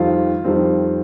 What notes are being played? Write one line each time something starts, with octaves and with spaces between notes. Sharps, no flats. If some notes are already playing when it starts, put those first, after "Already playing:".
Already playing: F2 D#3 G3 C4 F4
F2 D#3 G3 C4